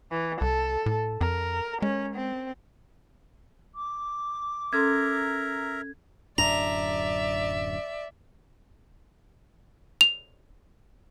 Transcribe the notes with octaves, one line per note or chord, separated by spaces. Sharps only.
E3
C2 A4
A2
F2 A#4
G#3 C#4
C4
D6
C#4 A4 A#4 E5 A#5 C6 G#6
D1 F#2 D4 D5 E5 A#5
F7